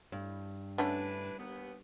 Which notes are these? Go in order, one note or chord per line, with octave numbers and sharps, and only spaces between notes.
G2
D3 A3 C#4 D4 E4 B4
D#2 B3